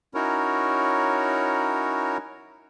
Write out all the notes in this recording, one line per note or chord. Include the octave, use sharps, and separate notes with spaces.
C#4 D#4 E4 F#4 A#4 C#5